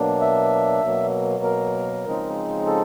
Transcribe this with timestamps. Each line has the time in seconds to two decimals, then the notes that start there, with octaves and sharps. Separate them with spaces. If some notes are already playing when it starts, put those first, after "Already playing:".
Already playing: B2 F#3 A#3 D4
0.21 E5
0.83 B2 F#3 A#3
1.44 A#4
2.04 C#3 F3 G#3 C4 D#4
2.66 A4